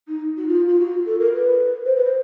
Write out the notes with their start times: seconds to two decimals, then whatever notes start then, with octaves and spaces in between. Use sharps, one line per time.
0.08 D#4
0.37 F#4
0.48 F4
0.68 F4
0.80 F#4
1.06 A4
1.20 A#4
1.33 B4
1.86 C5
1.96 B4
2.05 C5